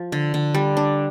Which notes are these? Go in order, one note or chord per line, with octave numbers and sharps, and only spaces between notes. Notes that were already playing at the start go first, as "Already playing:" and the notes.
Already playing: F3
D3
D3
G3
D4